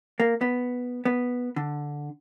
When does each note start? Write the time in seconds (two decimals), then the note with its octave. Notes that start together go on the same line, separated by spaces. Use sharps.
0.20 A#3
0.41 B3
1.05 B3
1.56 D3